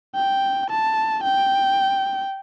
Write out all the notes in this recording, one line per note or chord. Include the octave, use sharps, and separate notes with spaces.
G5
A5
G5